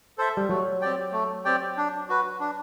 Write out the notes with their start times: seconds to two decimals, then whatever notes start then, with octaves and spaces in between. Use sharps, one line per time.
0.18 A4 C5 E5
0.37 G3
0.49 F#3 A3
0.81 C4 G4 D5 G5
1.12 A3
1.45 C4 G4 D5 G5
1.77 D4
2.09 F#4 B4
2.40 D4